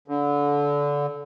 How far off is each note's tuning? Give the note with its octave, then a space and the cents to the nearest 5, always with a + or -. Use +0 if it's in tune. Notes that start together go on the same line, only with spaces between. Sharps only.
D3 -25